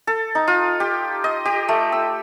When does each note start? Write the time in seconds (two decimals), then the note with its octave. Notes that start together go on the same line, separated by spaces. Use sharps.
0.07 A4
0.35 D#4
0.47 F4
0.80 G4
1.24 D#5
1.45 G4
1.68 A3
1.92 E6